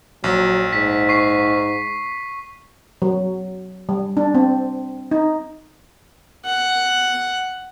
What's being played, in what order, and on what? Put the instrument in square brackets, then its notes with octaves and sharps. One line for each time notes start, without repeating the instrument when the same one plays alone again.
[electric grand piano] A#1 [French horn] F#3
[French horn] G#2 [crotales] B6
[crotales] C#6 C7
[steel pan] F#3
G3
D4
C4
D#4
[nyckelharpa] F#5